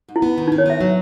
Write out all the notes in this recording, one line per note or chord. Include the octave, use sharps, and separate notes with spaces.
G#2
E4
B3
D#3
D#4
D#3
C#5
B3 E5
F#3